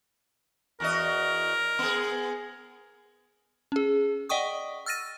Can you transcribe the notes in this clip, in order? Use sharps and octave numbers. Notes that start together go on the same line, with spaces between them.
E2 F#4 A#4 D#5
B3 G#4
C#4 G#4
D5 D#5 F#5 G5 C#6 D#6
E6 F6 A6 A#6 D#7